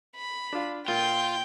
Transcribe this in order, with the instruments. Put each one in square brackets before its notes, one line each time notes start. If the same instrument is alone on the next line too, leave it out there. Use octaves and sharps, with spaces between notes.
[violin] B5
[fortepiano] D4 F4
[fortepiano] A#2 [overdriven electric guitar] F4 [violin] G5 G6